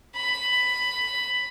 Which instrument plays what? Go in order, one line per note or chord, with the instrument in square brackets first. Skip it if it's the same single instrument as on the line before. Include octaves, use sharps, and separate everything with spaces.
[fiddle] B5